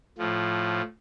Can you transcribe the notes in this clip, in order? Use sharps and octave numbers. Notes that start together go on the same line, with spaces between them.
A2 F3